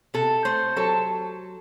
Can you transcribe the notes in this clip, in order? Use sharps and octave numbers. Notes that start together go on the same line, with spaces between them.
C3 A4
A3 C5
F#3 A4